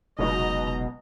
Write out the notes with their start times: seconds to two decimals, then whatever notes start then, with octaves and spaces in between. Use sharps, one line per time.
0.19 F1 C#2 B2 F#3 D#4 D#5 A#5